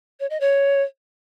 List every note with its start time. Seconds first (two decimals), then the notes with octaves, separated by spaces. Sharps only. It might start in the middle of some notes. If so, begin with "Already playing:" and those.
0.20 C#5
0.30 D#5
0.40 C#5